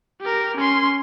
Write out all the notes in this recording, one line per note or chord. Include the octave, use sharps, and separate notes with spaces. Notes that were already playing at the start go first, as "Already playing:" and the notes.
G4 A#4
C#4 C6